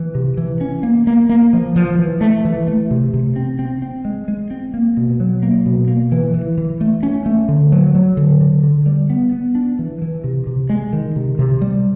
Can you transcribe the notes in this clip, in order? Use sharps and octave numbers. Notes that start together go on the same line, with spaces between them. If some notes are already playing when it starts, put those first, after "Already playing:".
Already playing: E3
C3
E3
C#4
A#3
A#3
A#3
F3
F3
E3
A3
E3
A3
C3
C3
C4
C4
C4
G#3
G#3
C4
A#3
B2
F#3
A#3
B2
A#3
E3
E3
E3
A3
C#4
A3
D3
F#3
F#3
D3
D3
D3
G3
B3
B3
D4
E3
E3
C3
C3
G#3
D#3
C3
C3
G3